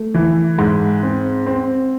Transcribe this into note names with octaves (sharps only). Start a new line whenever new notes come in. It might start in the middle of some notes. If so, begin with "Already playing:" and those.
Already playing: A3
E3
G#2
C4
C4